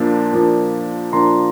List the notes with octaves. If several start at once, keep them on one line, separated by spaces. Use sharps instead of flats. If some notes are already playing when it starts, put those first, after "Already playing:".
Already playing: A#2 F3 A#3 D4 A5
A#2 F3 A#3 D4
A#2 F3 A#3 D4 A#5 C6